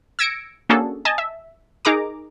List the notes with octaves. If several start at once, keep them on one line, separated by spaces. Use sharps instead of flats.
E6 G#6 A#6 C#7 D7
A#3 C#4 D4 F#4 G#4 A4
D#5 G#5 A5
E5
D#4 G#4 A#4 A#5 D6